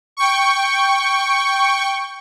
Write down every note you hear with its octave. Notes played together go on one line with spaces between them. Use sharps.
G5 C#6